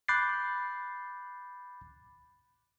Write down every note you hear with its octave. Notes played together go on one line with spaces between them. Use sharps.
B5 D6 F#6 G6 A6 C7